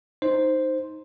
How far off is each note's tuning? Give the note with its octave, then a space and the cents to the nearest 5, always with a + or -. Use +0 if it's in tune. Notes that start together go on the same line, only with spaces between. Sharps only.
D#4 +0 C5 +0